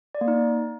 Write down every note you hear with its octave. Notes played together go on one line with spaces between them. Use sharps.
D5
A#3
D#4